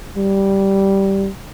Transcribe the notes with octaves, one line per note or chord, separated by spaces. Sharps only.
G3